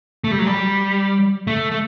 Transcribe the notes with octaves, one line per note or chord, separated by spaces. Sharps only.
A3
G3
F#3
G3
A3
A3